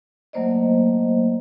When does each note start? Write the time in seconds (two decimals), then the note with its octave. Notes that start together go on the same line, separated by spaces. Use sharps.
0.33 F#3 A3 A#3 C5 D5 D#5